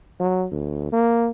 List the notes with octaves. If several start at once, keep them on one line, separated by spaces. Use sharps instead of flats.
F#3
D2
A#3